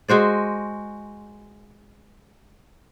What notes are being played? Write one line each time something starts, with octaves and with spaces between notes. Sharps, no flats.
G#3 F#4 C5 D5